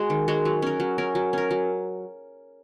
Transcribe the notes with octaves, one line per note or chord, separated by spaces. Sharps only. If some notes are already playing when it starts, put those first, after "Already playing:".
Already playing: G#3 F#4
D#3
G#3 F#4
F#3
C#4 A#4
F#3
C#4 A#4
F#3
C#4 A#4
F#3